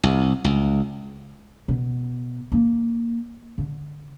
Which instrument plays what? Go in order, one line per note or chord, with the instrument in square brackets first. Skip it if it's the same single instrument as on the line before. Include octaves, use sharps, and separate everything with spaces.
[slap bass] C2
C#2
[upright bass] B2
A#3 D#4
D3